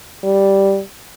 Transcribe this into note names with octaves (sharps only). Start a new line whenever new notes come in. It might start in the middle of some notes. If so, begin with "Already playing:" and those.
G3